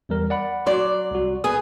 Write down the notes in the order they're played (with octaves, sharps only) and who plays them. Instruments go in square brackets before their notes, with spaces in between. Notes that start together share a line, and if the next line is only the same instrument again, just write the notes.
[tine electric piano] E2 G3 A#4
D5 F#5 B5
[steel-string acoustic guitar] F#3 D5 [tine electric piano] C6
[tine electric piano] C2 F#4
[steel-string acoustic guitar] B3 G#4 [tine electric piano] D#6